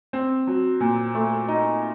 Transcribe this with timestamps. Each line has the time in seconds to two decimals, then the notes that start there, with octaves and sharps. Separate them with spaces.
0.13 C4
0.47 F#3
0.80 A#2
1.15 A3
1.48 D#4